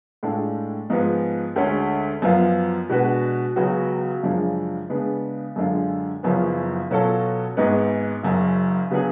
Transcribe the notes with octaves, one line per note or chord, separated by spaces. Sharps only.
A2 G#3 D4 F4 A4
G#2 F3 G#3 B3
D2 D3 G#3 C#4
F#2 F3 B3 F4
B2 G#3 D4 F#4 B4
C#2 C#3 F#3 B3 F#4
F#2 C#3 F3 G#3 D4
C#3 G#3 B3 D4
F#2 D3 G#3 D4 F4
F#1 F#2 C#3 F3 B3
B2 F#3 C#4 F4 A4
G#1 G#2 G#3 B3
F#1 F#2 C#3
C#3 F#3 B3 D4 G#4